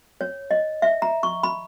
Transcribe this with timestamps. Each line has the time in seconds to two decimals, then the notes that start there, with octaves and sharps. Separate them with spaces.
0.21 C#5
0.51 D#5
0.82 E5
1.02 A#5
1.23 C#6
1.43 B5